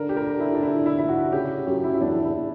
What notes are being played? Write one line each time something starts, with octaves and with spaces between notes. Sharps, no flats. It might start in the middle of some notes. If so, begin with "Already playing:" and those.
Already playing: D3 A#4
G4
A#4
E4
D4
E4
E4
E4
F#4
C#3 G4
F#2 G4
E4
E4
E2 D4
E4